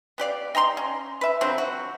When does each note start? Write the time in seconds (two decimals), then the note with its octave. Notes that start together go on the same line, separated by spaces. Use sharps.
0.18 B3 G4 D5 F5
0.55 D#5 G5 A#5 C6
0.77 C#4
1.21 B4 E5
1.41 D3 F3 F#3 C4
1.58 F#4